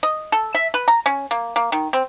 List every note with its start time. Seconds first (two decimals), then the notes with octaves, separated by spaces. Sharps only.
0.03 D#5
0.32 A4
0.55 E5
0.74 B4
0.88 A#5
1.06 C#4
1.31 A#3
1.56 A#3
1.72 D#3
1.93 C4